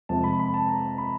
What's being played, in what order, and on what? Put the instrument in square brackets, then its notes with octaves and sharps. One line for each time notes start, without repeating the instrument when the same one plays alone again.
[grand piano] F2 C3 F3 G#3 A5
B5
B5
A5
A#5
B5